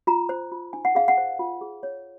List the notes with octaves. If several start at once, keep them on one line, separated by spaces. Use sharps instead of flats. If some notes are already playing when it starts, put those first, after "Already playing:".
F4 A#5
C5
F4
D#4 G#5
F#5
G#4 F5
F#5
C5
F4
G#4
C#5